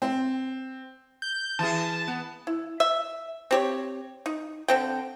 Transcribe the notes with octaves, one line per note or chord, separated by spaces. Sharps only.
C4
G6
E3 G#4 A5
B3
E4
E5
C4 G4 C#5
D#4
D3 C4 G5